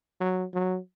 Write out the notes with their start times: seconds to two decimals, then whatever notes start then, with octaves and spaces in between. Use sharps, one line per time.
0.20 F#3
0.54 F#3